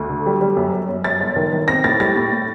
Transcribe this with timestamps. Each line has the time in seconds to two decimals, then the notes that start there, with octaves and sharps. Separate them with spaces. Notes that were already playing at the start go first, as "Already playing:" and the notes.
Already playing: D2
0.09 D3
0.26 G3
0.41 G3
0.56 F#2
0.73 F#2
0.89 F#2
1.04 F#2 A6
1.20 G1
1.36 D#3
1.52 D#3
1.68 C4 A#6
1.84 A2 A6
2.00 G3 A6
2.16 A2
2.32 A2